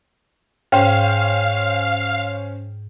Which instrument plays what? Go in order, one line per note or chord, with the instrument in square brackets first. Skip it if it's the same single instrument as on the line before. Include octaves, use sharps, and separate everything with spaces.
[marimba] G#2 [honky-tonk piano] C#4 C5 [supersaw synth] F5 [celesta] G5